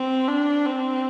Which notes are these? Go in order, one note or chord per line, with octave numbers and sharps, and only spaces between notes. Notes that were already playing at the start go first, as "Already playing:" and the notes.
Already playing: C4
D4
C4